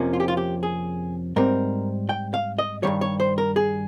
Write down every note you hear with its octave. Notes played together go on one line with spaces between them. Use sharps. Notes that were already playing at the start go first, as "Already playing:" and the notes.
Already playing: F2 C3 F3 A#3 C#4
F4
G4
F4
G4
G#4
G#2 G3 C4 A#4
G5
F5
D#5
G2 D#3 G3 C#5
C#5
C5
A#4
G#4